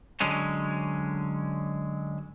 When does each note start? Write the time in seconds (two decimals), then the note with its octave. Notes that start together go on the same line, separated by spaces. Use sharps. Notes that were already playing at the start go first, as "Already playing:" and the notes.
0.20 D3 F#3 G#3 C#4